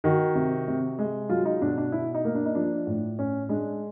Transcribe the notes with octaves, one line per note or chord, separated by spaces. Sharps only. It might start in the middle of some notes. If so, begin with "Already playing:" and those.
D#3 F#4
C3
C3
G#3
F#3 F4
D#4
B2 D4
D4
B2 E4
D#4
A#3
D4
D#4
F3 D4
A2
A2 C#4
G#3 D4